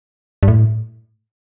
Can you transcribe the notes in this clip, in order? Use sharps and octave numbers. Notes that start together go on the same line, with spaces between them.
G2
A2